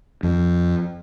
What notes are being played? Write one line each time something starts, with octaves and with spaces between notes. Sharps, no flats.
F2